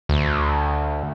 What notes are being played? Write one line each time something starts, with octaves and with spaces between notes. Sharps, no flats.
D2